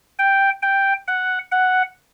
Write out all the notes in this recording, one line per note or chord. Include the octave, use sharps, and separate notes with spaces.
G5
G5
F#5
F#5